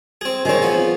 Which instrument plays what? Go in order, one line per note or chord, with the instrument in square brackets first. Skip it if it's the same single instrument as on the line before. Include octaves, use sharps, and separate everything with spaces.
[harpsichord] C4 G#4
[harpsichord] D#3 C4 [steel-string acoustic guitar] G#4 C#5
[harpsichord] F3 B3